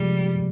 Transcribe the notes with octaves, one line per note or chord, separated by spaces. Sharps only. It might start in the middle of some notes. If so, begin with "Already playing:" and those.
Already playing: C3 F3 G3 G#3